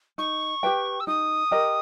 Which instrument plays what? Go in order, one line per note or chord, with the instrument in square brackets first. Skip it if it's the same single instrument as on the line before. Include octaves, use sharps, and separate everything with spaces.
[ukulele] D#4 [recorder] C#6
[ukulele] G4 B4 G5
[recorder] E6
[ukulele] D#4 [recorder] D#6
[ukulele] G4 A#4 D#5